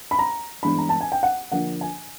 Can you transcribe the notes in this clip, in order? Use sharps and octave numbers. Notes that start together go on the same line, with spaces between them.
B5
A#5
G2 E3 G#3 B3 D4 B5
A#5
A5
G#5
G5
F#5
D3 F3 A#3 D4 F#5
G#5